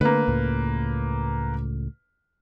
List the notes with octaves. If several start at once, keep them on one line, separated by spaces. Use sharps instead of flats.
D3 A3 A#3 B4
C#2 A2